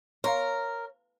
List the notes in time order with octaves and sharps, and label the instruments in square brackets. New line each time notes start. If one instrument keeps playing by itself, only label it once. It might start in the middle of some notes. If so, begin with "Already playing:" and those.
[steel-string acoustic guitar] A#4 [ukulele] C#5 [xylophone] F5 A#5 C6